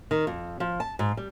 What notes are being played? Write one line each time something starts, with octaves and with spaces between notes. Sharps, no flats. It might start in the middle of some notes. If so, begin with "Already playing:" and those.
D#3
F2
F3
A5
G#2
G3